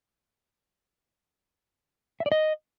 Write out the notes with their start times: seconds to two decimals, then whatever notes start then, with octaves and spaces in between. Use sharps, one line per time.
2.20 E5
2.26 D5
2.32 D#5